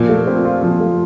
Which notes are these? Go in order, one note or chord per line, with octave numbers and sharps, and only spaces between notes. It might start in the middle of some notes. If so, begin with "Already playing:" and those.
Already playing: A#2 F3
A3
C4
F4
F3
A3